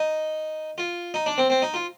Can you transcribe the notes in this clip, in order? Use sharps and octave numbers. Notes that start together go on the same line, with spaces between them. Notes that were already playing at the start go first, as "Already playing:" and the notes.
Already playing: D#4
F4
D#4
D4
C4
C4
D#4
F4